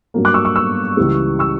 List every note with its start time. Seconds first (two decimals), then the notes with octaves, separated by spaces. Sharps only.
0.14 G2 F#3 A#3
0.25 D6 F#6
0.34 C#6 E6
0.45 C#6 E6
0.56 C#6 E6
0.97 C#2 C#3 E3 G3
1.39 C#6 E6